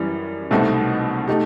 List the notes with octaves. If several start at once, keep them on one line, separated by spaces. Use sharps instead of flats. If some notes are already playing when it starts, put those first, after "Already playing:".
Already playing: F#2 E3 G3
C2 B2 A3 C4 D#4
A3 D#4 G4